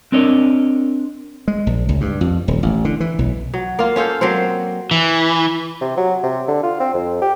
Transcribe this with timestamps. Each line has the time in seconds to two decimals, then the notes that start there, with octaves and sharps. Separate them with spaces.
0.12 C4 D4 A#4 C#5 D#5
1.48 G#3
1.67 A#1
1.89 C#2
2.01 G2
2.21 F2
2.48 D#1
2.63 A1
2.85 D3
3.00 E3
3.19 B1
3.54 F#3
3.79 A#3 F4
3.96 C#4 F4 A4 C5
4.21 F#3 A#3 C4 C5
4.91 E3
5.81 C3
5.97 F#3
6.23 C3
6.48 D3
6.63 F4
6.80 C4
6.94 F2
7.22 G4